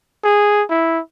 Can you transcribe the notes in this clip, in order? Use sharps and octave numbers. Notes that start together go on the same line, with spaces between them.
G#4
E4